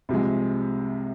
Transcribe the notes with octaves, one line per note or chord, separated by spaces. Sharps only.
C2 C3 F3 G#3